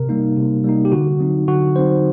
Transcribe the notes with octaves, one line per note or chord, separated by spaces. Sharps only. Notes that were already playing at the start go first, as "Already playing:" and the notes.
Already playing: C3 A#4
G3 A#3 D#4
C3
G3 A#3 D#4
G4
D3 F#4
F#3 C4 D#4
D3 F#4
F#3 C4 D#4 C5